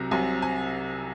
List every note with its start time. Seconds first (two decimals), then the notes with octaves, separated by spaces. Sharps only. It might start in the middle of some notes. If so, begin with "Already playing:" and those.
Already playing: C2 C3 F#3 A#5
0.11 C2 C3 F#3 G#5
0.42 G#5